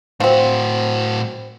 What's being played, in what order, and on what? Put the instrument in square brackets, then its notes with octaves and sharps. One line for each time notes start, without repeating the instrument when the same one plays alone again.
[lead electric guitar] A2 F#4 [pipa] F3 C4